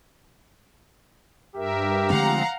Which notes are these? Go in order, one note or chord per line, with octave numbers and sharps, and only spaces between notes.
G2 G4 A#4 E5
D3 F3 G#3 A3 C4 F5 F#5 A#5